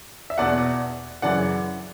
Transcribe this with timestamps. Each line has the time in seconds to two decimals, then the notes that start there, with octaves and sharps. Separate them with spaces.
0.30 E5
0.38 E2 B2 D5 F#5
1.22 F#2 C#3 E3 D5 F#5